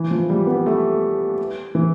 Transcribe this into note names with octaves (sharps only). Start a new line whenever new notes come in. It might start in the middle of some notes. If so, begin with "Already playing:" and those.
Already playing: E3
F3
G3
B3
A3
E3